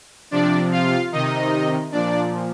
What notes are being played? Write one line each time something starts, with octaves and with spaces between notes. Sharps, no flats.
C3 F3 D4 D5
F4 F5
C3 D#3 D#4 D#5
A#2 F3 D4 D5